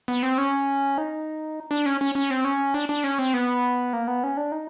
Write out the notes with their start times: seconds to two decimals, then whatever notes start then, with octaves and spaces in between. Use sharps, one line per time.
0.08 B3
0.23 C4
0.38 C#4
0.98 D#4
1.71 D4
1.86 C#4
2.01 C#4
2.15 C#4
2.31 C4
2.45 C#4
2.74 D4
2.89 D4
3.04 C#4
3.19 C4
3.34 B3
3.93 A#3
4.07 B3
4.23 C#4
4.37 D4
4.52 D#4